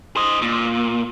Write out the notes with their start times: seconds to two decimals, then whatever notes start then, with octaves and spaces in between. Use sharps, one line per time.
0.16 C5 D#5
0.42 A#2